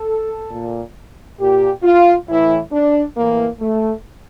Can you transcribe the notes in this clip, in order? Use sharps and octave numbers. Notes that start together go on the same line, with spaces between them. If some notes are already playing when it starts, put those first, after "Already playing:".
Already playing: A4
A#2
A#2 G4
F4
A2 E3 E4
D4
A2 E3 A#3
A3